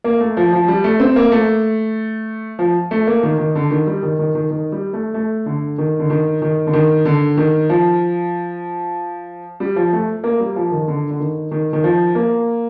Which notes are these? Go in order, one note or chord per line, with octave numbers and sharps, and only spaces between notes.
A#3
A3
F3
F3
G3
A3
C4
A#3
A3
F3
A3
A#3
D#3
D#3
D3
D#3
G3
D#3
D#3
D#3
D#3
G3
A3
A3
D3
D#3
D3
D#3
D#3
D3
D#3
D3
D#3
F3
G3
F3
A3
A#3
G3
F3
D#3
D3
D3
D#3
D#3
D#3
F3
A#3